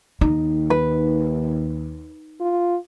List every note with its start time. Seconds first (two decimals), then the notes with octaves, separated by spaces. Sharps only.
0.21 D#2 D#4
0.70 B4
2.41 F4